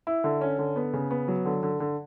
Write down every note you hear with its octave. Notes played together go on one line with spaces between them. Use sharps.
E4
D3
C#4
D3
B3
C#3
B3
F#3
D3
D3
D3